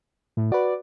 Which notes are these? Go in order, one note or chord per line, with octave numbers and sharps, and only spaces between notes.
A2
F#4 B4 D5